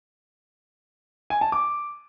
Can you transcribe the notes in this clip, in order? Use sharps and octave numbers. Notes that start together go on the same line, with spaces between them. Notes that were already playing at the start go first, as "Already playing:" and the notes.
G#5
A5
D6